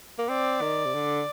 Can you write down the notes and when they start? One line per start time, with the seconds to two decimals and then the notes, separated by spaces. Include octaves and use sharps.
0.18 A#3
0.29 C4 D5
0.61 D#3
0.86 C3
0.94 D3